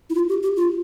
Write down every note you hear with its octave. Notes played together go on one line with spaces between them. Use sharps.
E4
F4
G4
G4
F4